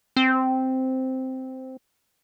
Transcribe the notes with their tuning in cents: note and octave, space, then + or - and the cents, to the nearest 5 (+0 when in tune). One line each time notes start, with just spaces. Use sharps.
C4 -5